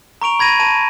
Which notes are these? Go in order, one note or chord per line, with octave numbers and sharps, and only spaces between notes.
A#5 C#6 D7 F7
B5 G#6 A#6 D#7
A5 D#7